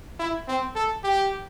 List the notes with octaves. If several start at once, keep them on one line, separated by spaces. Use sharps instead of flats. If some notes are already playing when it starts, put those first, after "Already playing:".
E4
C4
A4
G4